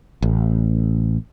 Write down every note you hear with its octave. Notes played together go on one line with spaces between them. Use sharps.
A1